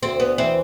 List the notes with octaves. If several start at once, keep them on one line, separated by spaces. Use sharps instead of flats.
D2 C4
B3
E3 C4